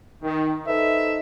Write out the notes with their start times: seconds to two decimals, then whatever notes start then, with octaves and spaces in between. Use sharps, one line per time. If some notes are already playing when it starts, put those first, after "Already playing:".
0.23 D#3
0.67 D#4 A4 B4 C5 E5